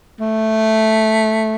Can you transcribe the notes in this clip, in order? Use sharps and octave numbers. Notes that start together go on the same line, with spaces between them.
A3